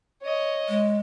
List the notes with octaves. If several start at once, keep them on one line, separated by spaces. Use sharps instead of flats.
C#5 D#5
G#3